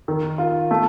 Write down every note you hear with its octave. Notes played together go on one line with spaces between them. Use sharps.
D#3
F4
A3